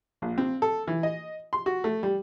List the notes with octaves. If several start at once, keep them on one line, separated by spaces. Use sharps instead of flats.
A#1
C4
A4
E3
D#5
C6
F#4
A3
G3